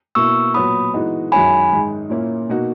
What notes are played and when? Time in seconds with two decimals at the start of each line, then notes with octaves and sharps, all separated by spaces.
0.15 B2 A#3 E4 C#6 E6
0.54 A#2 F#3 B3 B5 D#6
0.94 E3 G#3 B3 D#4 F#4
1.32 F#2 D#3 G#3 C#4 F#4 G#5 B5
1.72 G#2 D#3 G#3
2.10 A#2 A#3 C#4 E4
2.49 B2 A#3 D#4 F#4